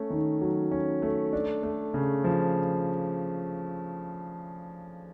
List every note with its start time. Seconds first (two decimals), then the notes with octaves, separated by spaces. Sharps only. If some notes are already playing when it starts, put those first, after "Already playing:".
Already playing: A3 C#4
0.10 D#3
0.41 F#3
0.71 C#4
1.02 A3
1.33 D4
1.63 A3
1.94 C#3
2.24 F3